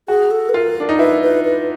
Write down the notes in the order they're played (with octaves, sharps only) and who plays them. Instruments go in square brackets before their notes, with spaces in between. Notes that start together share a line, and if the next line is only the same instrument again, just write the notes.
[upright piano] F#4 [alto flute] G#4
[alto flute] A4
B4
[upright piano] F4 [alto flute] A#4
[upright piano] D4
D#4
[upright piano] E4 [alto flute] B4
[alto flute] B4
B4